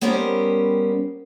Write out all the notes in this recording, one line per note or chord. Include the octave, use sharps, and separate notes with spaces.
G3 B3 C#4 G4 A#4 C5